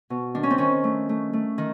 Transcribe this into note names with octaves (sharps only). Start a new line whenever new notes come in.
B2
D#3 D4
C#4
C4
D#3 C#4
A3
A3
A3
D#3